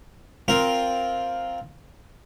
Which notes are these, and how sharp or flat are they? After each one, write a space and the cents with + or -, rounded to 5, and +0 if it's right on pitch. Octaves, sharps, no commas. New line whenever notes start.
C4 +0 F4 +0 A#4 +0